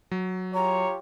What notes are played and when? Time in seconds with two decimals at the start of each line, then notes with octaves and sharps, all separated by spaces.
0.11 F#3
0.55 F4 G4 C#5 A#5